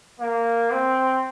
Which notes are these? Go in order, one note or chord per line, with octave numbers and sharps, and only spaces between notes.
A#3
C4